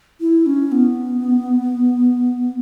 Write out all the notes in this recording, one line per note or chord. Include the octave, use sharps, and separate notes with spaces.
E4
C#4
B3